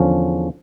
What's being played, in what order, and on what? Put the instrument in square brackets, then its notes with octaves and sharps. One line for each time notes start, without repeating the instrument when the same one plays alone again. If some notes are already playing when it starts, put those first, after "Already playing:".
Already playing: [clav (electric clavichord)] E2 D3 F3 C#4